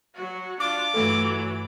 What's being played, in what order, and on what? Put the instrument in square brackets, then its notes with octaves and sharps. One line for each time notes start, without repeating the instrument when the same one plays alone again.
[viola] F#3 F#4
[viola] D4 F4 [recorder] D6
[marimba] G2 A3 A4 [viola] E3 F#3